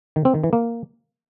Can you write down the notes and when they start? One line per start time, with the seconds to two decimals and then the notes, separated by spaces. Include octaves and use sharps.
0.16 D#3
0.25 C4
0.34 D#3
0.44 E3
0.53 A#3